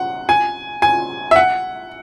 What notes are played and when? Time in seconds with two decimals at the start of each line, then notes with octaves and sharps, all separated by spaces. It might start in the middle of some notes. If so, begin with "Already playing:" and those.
Already playing: F#5
0.29 G#5
0.82 G#5
1.31 E5
1.36 F#5